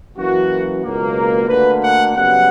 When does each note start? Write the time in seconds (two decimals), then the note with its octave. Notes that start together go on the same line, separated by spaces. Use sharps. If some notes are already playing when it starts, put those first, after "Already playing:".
0.16 F#2 E3 A#3 F#4
0.83 C#2 B2 F#3 A#3
1.16 A#4
1.49 D2 D3 A#3 B4
1.81 F#5
2.15 F#2 C#3 G3 B3 F#5